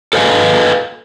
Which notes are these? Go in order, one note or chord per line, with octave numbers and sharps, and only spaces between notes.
A4 B4 D#5 F5 G#5